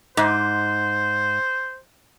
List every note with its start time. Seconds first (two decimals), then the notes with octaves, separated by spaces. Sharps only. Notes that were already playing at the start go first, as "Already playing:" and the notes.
0.17 G#2 C5